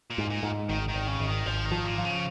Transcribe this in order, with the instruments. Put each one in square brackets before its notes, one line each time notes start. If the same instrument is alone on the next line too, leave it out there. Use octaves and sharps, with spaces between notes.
[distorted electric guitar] A#2
[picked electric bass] G#2
[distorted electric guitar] A#2
[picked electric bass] G#2
[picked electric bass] G#1 [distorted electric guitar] D#3
[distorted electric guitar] D#3
[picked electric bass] G#1
[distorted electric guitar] C#3
[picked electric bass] G#1
[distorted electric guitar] D#3
[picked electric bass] G#1 [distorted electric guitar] F3
[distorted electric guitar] D#3
[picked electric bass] F3
[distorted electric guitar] A#2
[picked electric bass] F3
[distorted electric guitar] C#3